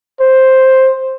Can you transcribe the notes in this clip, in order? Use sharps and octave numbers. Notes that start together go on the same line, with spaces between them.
C5